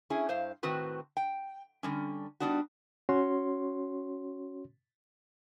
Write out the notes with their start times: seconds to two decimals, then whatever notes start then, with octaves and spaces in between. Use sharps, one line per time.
0.10 C#4 E4 G#4
0.29 G2 C5 F5
0.63 A2 D#3 C4 F#4 B4 C5
1.17 G5
1.83 D3 G3 C#4
2.40 G3 B3 D4 D#4 F#4
3.09 C#4 F#4 C#5 C6